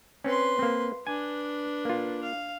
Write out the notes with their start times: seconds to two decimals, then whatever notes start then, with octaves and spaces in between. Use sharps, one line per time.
0.24 C4 C#4 B4 C6
0.59 A#3 C4
1.07 D4 B4 G#5
1.85 A#3 F4
2.23 F5